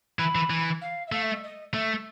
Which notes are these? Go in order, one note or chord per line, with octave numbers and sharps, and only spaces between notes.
E3 B5
E3
E3
F5
E5
A3 F5
E5
D#5
D#5
A3 E5